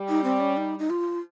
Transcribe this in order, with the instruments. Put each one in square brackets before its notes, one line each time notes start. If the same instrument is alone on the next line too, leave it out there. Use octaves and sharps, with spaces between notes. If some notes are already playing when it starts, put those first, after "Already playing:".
Already playing: [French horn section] G3
[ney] D#4
C4
C#4
D#4
D#4
F4